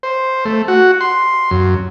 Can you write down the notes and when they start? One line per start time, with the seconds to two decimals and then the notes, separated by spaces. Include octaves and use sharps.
0.03 C5
0.45 A3
0.68 F#4
1.01 C6
1.51 F#2